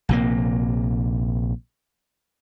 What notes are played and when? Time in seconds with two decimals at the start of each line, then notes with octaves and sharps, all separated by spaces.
0.09 A#1 C3 A#3